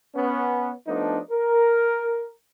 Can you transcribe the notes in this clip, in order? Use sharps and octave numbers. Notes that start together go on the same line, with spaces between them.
B3 C#4
F3 A3 B3 D4 D#4
A#4